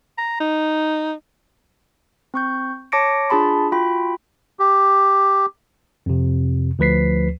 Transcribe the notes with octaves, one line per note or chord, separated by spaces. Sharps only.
A#5
D#4
C4 C#6 G6
C#5 A5 D6 A#6 C#7 D7
D4 F4 G#4 A5 B5 C6
F4 F#4 G5 B5
G4
F2 C3
D2 F3 B4 B6 C7